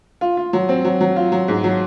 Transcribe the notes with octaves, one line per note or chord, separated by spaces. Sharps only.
F4
F4
F#3
C4
F#3
F#3
F4
F#3
G#2
F#3